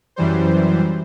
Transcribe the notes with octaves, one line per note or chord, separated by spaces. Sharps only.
F#2 E3 G3 C5